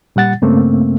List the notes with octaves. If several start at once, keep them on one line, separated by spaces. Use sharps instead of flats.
A#2 G3 F#5 A6
G2 C#3 A3 A#3 C4